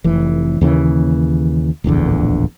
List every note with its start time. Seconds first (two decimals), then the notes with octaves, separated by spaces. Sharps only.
0.04 F1 E3
0.61 D#2 C#3 E3
1.84 D1 A#1 E2 D3